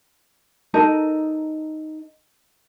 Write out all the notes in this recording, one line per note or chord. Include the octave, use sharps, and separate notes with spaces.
D#4 A4 A#4